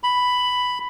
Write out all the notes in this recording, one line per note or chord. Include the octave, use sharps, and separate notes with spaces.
B5